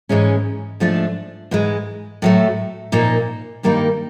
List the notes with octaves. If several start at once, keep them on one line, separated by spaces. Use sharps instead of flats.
G#2 E3 G#3 C#4
G#2 F3 A3 D4
G#2 E3 G#3
A2 F#3 A3
A#2 F3 A#3 D#4
G2 D#3 G3 A#3 D#4